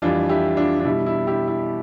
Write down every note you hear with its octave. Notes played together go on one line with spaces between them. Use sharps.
F2 E3 G3 D4 F4
E4 G4
D4 F4
D4
B2 G3 E4
E4
E4 G4
E4